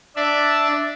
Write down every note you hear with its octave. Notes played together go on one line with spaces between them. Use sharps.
D4 D5 E5